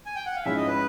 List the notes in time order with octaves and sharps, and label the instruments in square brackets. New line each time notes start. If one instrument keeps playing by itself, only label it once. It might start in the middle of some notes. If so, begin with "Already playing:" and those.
[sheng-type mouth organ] G#5
G5
F#5
F5
[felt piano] G#2 F3 G#3 C#4 E4 [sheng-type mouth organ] E5
[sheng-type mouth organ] D#5
B4